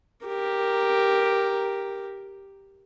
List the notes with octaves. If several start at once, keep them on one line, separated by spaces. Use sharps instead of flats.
G4 A#4